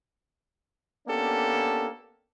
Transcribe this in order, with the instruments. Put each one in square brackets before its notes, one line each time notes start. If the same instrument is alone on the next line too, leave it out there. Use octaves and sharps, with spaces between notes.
[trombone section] A#3 B3 C#4 D4 G4 A4